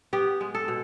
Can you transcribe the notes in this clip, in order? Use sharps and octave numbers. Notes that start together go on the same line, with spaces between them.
B3 G4
G#3
A4
B2